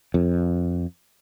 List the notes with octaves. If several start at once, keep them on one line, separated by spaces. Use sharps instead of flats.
F2